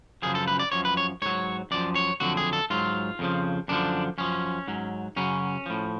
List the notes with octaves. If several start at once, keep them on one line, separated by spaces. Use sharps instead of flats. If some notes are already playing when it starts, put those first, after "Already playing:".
F#2 C#3 F3 G#4
A4
B4
D5
F#2 F3 C#5
B4
C#5
G#2 F#3 C#5
F#2 F3 D5
C#5
F2 D3 F#3 F#4
G#4
A4
G#2 F#3 F4
F2 C#3 F3
F#2 D3 F3 D4
F#2 F3 C#4
G#2 F#3
F#2 C#3 F#3 C#4
A2 F3